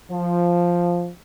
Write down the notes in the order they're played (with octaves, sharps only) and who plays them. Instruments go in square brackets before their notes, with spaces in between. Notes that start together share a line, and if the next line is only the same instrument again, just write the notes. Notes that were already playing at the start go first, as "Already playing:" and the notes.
[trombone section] F3